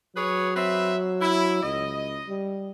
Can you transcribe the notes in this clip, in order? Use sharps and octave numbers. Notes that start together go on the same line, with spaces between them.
F#3 G#4 B4 C#5
C4 B4 E5
E4
C#2 D#5
G3